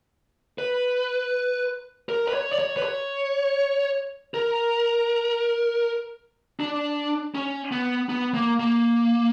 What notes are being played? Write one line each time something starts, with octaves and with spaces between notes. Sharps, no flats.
B4
A#4
B4
C#5
D5
C#5
B4
C#5
A#4
D4
C#4
B3
B3
A#3
A#3